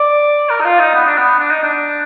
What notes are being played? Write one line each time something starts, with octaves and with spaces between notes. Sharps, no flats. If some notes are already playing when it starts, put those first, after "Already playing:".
Already playing: D5
A#4
D#4
F4
D#4
B3
D4
B3
D4
D#4
D4